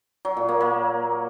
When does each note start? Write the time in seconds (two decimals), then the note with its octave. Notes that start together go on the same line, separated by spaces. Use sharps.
0.25 F#3
0.37 A#2
0.49 A#3
0.61 A#3